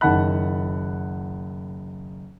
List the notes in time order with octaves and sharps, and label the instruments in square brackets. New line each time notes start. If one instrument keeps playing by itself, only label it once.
[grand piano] F#1 D#3 F#5 A5 B5 F#6